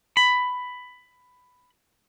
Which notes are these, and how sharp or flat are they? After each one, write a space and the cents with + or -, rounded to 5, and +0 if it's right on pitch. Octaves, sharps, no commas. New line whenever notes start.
B5 +10